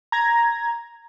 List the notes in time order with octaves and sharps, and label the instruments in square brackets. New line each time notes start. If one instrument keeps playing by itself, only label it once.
[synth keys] A#5 G#6 A#6